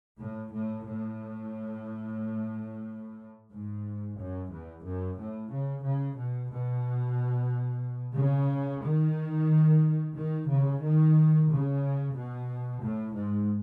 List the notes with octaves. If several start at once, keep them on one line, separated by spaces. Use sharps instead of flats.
A2
A2
A2
G#2
F#2
E2
F#2
A2
C#3
C#3
B2
B2
C#3
D#3
D#3
C#3
D#3
C#3
B2
A2
G#2